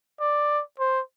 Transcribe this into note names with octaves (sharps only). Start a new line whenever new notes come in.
D5
C5